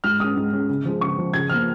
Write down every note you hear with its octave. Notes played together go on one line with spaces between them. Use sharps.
G#2 F6
G#3 C#4 D#6
G#2
G#3 C#4
C#3
F3 G#3
C#3 C#6
F3 G#3
C#3 G#6
F3 A#3 F6